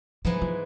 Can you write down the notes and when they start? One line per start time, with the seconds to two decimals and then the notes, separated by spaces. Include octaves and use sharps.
0.25 G#2 E3 F3 G#3 B3 E4
0.41 F3